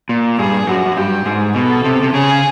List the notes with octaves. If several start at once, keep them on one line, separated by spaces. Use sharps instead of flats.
A#2
G2 G#4
F#2 F#4
F#2
G2 G4
G#2 G#4
B2 A4
C3
C3
C#3 G#4